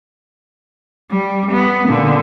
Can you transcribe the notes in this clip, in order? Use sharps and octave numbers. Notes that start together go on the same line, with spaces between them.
G3
B3
A#2 D3